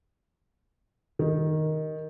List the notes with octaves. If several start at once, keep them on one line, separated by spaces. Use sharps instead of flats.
D#3